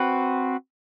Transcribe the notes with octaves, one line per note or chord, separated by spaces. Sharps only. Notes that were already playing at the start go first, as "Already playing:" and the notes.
Already playing: C4 F#4 B4